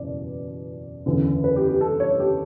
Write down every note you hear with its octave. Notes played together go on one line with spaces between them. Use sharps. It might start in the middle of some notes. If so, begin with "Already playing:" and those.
Already playing: F#1 E2 B2 D5
F#1 E2 D3
B4
G4
G4
A4
C#5
G4